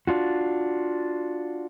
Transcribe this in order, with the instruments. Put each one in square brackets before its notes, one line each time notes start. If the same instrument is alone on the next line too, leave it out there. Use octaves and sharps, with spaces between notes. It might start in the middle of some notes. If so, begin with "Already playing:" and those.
[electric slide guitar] D4 F4 F#4